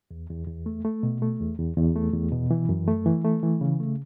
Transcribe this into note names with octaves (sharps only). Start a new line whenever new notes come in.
E2
E2
E2
A3
A3
B2
A3
E2
E2
E2
A3
E2
B2
E3
F#2
A3
E3
A3
E3
C#3
A3